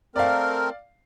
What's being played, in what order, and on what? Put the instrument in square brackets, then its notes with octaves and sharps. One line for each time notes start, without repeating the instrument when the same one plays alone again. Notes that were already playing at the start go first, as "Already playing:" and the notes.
[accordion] A3 C4 A#4 [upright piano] D5 F5